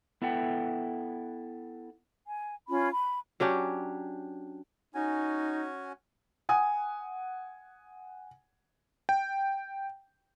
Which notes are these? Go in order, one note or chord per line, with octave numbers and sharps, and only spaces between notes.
B3 E4 A4 F#5 G5
G#5
C#4 F4 B5
B5
F#3 C#4 D4 G4
C#4 D#4 F#4 G#5
F#5 G#5 D#6
G5